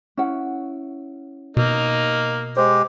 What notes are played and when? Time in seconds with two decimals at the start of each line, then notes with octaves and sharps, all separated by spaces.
0.17 C#4 E4 F#5
1.57 B2 A#3 D#4
2.57 G#3 G4 C5